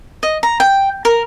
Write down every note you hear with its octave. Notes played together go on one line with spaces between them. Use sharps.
D#5
A#5
G5
A#4